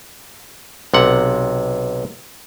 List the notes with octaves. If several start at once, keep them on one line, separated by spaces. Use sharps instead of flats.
B1 C3 F#5